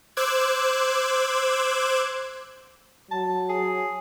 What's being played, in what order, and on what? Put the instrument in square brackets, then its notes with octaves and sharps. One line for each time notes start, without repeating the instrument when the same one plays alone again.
[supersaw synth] C5 D6 E6 F#6 G#6
[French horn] F#3 [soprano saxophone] A5
[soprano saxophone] G#4